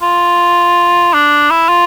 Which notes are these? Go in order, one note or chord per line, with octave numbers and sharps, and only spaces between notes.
F4
D4
E4
F4